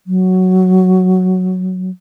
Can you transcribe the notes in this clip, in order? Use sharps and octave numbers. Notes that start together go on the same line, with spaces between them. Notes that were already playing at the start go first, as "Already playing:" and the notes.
F#3